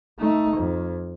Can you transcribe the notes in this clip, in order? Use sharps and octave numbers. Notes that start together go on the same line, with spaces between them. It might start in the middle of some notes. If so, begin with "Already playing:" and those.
A3 D#4
F2